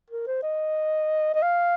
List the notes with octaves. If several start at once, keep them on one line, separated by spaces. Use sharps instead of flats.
A#4
C5
D#5
D#5
F5